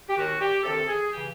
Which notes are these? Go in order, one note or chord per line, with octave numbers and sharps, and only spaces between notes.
G4
D#2 D#3 F#4
G4
D2 C3 D#3 A4
G#4
C#3 E3 G4